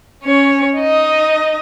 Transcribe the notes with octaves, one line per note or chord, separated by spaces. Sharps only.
C#4 C#5
D#4 D#5